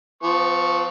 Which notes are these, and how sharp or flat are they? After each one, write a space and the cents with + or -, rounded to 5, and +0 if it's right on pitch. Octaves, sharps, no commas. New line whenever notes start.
F3 +0 B3 +40 C#6 +0